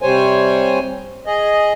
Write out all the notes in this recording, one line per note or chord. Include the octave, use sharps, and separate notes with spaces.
C3 G3 C5 C#5 G#5
G#4 D#5